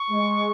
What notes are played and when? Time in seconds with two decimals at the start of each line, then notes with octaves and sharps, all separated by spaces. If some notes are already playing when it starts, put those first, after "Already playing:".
Already playing: C#6
0.10 G#3